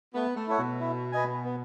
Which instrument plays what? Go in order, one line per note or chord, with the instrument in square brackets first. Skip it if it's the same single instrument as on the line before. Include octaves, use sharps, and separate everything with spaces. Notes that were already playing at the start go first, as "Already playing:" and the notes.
[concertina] A3 [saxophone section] B3
[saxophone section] A3
[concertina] E4 A4 C#5 F#5
[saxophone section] B2
[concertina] E4
B4 D#5 G#5
B3